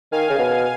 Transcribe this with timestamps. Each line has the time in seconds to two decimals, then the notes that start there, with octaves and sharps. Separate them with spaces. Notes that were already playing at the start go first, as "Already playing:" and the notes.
0.12 D#3 F5 G#5
0.29 C#3
0.38 B2